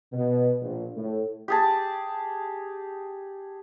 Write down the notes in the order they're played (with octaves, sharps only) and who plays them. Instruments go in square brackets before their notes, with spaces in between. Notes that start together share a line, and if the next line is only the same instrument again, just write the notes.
[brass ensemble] B2
A#1
A2
[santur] G4 G#4 A5